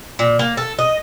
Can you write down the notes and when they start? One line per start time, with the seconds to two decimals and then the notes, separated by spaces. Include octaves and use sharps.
0.19 A#2
0.39 A#3
0.57 A4
0.79 D#5